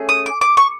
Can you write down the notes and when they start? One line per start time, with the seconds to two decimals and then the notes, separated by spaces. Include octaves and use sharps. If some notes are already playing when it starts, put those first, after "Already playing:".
Already playing: A3 C#4 G#4
0.09 D#6
0.26 D6
0.41 D6
0.57 C#6